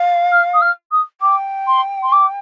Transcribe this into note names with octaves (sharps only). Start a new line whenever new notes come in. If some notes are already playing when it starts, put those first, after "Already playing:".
Already playing: F5
F6
D#6
F6
D#6
G5 D6
C6
C6
D6